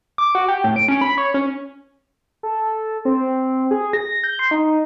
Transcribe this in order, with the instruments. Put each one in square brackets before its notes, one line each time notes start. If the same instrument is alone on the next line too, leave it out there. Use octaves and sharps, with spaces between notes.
[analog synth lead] D6
F#4
G4
A2
D7
C#4
B5
C#5
C#4
A4
C4
G#4
A#6
G6
C6
D#4